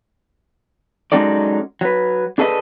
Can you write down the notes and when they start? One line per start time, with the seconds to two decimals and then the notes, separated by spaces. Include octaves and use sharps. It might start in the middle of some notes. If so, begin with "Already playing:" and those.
1.12 F#3 G#3 C#4 D#4 A4 D5
1.81 F#3 B4
2.38 D4 G#4 A4 B4 D#5